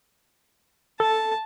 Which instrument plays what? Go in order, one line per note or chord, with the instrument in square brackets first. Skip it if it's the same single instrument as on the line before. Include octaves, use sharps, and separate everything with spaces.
[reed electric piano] A4 [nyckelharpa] A5